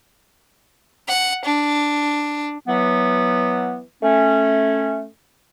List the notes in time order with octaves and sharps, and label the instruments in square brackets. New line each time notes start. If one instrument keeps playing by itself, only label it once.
[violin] F#5
D4
[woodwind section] E3 F#3 B3
A3 C#4